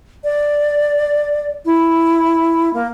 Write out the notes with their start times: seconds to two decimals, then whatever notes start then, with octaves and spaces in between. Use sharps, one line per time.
0.24 D5
1.65 E4
2.74 A#3